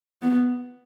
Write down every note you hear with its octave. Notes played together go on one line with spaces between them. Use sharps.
B3